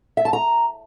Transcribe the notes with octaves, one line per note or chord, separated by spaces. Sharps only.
E5
A5
A#5